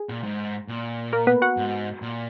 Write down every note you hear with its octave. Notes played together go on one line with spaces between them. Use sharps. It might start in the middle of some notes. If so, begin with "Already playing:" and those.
Already playing: G#4
A#2
G#2
A#2
A#3 A#4
B3 B4
F#4 F#5
G#2
A#2